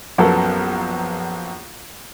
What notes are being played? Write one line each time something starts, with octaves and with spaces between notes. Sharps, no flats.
A#1 F#2 B3 A4 A#4